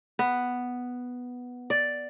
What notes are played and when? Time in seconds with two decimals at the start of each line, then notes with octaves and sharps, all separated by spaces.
0.19 B3
1.70 D5